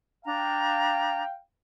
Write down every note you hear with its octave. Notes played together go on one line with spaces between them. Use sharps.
D4 F5 G5 A#5